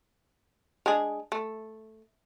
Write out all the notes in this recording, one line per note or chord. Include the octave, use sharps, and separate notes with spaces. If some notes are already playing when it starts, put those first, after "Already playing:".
G#3 D4 G#4
A3